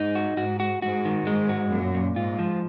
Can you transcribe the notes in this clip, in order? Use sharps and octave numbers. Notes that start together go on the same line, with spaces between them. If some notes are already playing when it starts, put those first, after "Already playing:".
Already playing: G#2 D#4
F#4
G#2 F#4
F#4
G#2 F#4
D#3
G#2 G#3
F#4
F#2 A#2
A#2
G#2 F4
F3